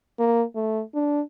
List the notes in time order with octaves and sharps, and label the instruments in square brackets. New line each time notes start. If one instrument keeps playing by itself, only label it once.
[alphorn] A#3
A3
D4